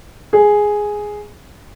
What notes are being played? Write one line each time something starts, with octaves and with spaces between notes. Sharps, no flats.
G#4